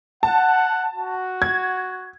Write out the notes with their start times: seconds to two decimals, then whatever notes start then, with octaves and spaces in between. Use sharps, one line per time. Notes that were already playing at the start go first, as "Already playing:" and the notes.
0.23 F#5 A5
0.92 F#4
1.42 G#6